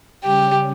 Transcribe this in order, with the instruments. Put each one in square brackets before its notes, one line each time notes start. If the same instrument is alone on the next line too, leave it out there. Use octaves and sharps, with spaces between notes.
[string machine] C#3 G3 C#4 [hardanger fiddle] G4